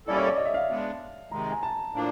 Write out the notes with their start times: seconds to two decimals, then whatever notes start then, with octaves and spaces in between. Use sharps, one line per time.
0.07 G3 A#3 C#4 E4 A4 D5
0.17 C#5
0.27 D5
0.36 D#5
0.45 E5
0.54 F5
0.70 G#3 B3 D4
1.31 C3 D#3 G#3 A#5
1.52 G#5
1.63 A5
1.93 A2 F3 A#3 D4